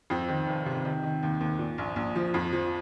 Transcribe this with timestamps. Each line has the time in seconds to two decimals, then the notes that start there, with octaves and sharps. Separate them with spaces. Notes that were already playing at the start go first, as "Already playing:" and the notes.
0.10 F2 C4
0.29 D#3
0.47 F1
0.66 C3
0.85 D#3
1.03 D#3
1.23 D#2
1.40 D#2
1.59 A#2
1.78 A#1
1.96 A#1
2.15 F3
2.34 F2
2.52 F3